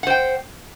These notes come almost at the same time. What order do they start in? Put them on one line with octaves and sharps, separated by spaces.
F#5 C5 G5